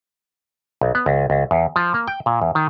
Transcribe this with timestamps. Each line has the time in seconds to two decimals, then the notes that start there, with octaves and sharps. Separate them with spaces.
0.81 B1
0.95 B3
1.06 C#2
1.30 C#2
1.51 E2
1.76 F3
1.94 A#3
2.08 G5
2.26 A#2
2.42 E2
2.55 D#3